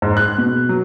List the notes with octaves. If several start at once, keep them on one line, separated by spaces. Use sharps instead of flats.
G#2
F#6
B2
F#3